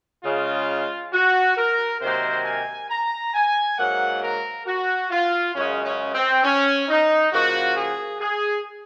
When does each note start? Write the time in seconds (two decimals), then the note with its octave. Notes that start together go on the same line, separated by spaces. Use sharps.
0.24 C#3 G#3 F4
1.13 F#4
1.57 A#4
2.01 C3 D#3 F#3 A#3 C5
2.46 G#5
2.90 A#5
3.34 G#5
3.78 G#2 F#3 A#3 F#5
4.22 A#4
4.67 F#4
5.11 F4
5.55 F#2 C#3 G#3 C#4
5.85 C#4
6.14 C4
6.44 C#4
6.88 D#4
7.32 C#3 F3 A#3 F#4
7.77 G#4
8.20 G#4